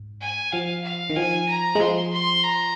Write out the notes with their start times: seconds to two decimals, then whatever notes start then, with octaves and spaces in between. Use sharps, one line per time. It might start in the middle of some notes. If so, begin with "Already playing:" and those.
Already playing: G#2
0.21 G#5
0.53 F3 F5
0.84 F5
1.10 D#3
1.16 F3 G#5
1.49 A#5
1.75 G#3
1.80 F3 C6
2.13 C6
2.44 A#5